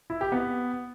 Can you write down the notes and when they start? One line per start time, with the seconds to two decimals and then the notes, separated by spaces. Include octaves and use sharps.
0.10 E4
0.21 G4
0.32 B3